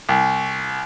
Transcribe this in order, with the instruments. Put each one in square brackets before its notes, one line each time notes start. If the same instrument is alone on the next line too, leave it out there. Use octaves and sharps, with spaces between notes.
[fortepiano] C2